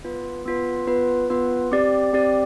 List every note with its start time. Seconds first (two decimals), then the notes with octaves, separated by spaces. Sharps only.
0.04 B3 F4 B4
0.45 B3 F4 B4
0.87 B3 F4 B4
1.30 B3 F4 B4
1.72 C4 G4 D5
2.13 C4 G4 D5